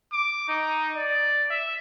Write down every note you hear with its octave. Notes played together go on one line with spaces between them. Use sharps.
D6
D#4
D5
E5